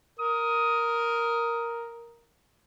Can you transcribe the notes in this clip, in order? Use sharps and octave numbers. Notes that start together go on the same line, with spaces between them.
A#4 D#6